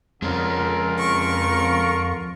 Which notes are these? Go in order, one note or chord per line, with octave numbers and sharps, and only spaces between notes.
F2 D3 G#3 C#4 F4 A#4
C#6